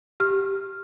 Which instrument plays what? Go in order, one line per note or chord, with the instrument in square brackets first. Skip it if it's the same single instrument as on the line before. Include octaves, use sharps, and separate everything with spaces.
[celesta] G4 F6